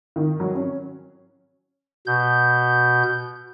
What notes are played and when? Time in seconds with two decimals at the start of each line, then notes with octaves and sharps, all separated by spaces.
0.16 D#3
0.40 F#3
0.55 C#4
2.07 B2 G6